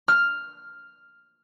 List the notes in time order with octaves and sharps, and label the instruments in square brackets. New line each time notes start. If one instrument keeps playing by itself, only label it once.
[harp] F6